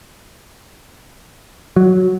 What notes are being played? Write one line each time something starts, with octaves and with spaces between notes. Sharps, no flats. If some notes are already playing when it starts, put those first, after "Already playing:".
F#3